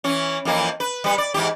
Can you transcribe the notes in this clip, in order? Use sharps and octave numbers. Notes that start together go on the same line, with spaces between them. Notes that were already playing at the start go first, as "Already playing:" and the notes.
E3 C#4
F2 E3 A#3
B4
G3 B4
D5
G#2 E3 G4